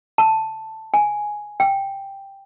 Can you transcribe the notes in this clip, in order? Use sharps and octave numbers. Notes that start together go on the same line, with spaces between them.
A5
G#5
G5